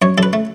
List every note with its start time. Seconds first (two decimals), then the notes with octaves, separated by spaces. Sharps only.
0.02 F#2 C#5
0.18 F#2 A4
0.23 B4
0.33 A3